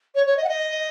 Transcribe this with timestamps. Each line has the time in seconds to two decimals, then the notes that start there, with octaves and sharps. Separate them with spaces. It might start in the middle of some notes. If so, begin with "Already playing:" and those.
0.15 C#5
0.26 C#5
0.37 D#5
0.44 F#5
0.48 D#5